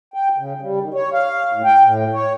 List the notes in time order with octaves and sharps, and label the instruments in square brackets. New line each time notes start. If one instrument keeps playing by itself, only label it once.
[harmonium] G5
C#3
G3
D#3
C#5
F5
A2
G5
A2
C#5